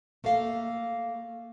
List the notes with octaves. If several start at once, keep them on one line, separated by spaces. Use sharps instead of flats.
A3 A#3 A4 F5